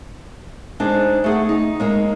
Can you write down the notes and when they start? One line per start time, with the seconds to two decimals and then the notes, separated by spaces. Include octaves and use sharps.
0.80 G#3 D4 D#4 G#4 C5
1.24 A3 G#4 F#5
1.49 D#4
1.80 G#3 A#3 D#4